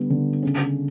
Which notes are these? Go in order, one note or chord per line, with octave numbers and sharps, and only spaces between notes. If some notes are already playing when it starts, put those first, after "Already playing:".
Already playing: D3 G3 B3
D3
C#3